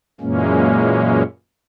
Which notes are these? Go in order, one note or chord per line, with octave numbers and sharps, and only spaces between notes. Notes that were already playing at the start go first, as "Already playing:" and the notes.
F#2 A#2 E3 G#3 A#3 C#4